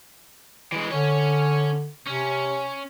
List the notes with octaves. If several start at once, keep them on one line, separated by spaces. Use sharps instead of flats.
E3 G#3
D3 C#4 C#5
C3 C#4